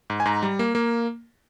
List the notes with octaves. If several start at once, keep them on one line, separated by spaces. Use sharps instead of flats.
G#2
G#5
G#2 A#5
G3
A#3
A#3